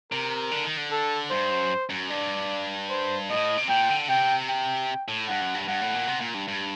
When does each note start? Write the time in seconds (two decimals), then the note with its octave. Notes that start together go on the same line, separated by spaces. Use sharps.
0.11 C3 A#4
0.51 D3
0.64 D#3
0.77 D3
0.91 A4
1.31 G2 C5
1.50 F#2
1.90 F#2
2.10 G2 D5
2.90 C5
3.29 A2 D#5
3.57 C3
3.69 A#2 G5
3.89 D3
4.09 C3 G5
4.49 G5
5.08 A2
5.28 G2 F#5
5.42 F#2
5.54 G2
5.68 G2 F#5
5.82 A2
5.95 A#2
6.08 C3
6.21 A#2
6.34 G2
6.48 G2